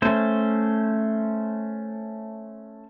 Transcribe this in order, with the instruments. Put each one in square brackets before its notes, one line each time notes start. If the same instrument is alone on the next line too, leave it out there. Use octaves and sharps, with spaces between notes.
[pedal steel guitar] A3 C#4 C5